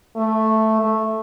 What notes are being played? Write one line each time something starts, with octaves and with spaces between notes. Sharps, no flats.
A3
A3